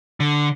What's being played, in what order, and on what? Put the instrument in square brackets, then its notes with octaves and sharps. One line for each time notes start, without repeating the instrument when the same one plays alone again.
[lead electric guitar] D3